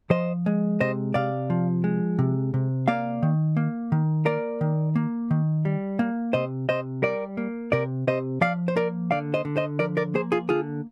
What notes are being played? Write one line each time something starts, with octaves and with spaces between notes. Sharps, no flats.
F3 C5 D#5
G#3
C3 C5 D#5
C3 D5 F5
F3
G#3
C3
C3
A#3 D5 F5
D#3
A#3
D#3
A#3 A#4 D5
D#3
A#3
D#3
G3
A#3
C3 C5 D#5
C3 C5 D#5
G3 A#4 D5
A#3
C3 A#4 D5
C3 C5 D#5
F3 D5 F5
C5
A#3 A#4 D5
D3 D5 F5
C5 D#5
D3
C5 D#5
F3 A#4 D5
A#4 D5
A#3 G#4 C5
F4 G#4
D3 F4 G#4